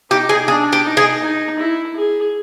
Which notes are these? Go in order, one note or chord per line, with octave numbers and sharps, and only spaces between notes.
D#4 G4
G#4
D4 G#4
G4
D#4
G#4
D#4
E4
G#4